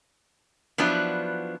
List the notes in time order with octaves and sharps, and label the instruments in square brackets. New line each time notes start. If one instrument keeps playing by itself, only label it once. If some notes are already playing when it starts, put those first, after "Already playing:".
[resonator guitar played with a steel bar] F3 F#3 B3 D4 E4